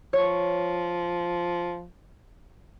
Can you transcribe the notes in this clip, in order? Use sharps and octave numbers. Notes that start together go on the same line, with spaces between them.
F3 C#5